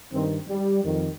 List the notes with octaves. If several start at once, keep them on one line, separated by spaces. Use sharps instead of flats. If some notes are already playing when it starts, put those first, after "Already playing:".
G2 D#3 C4
G3
F2 D#3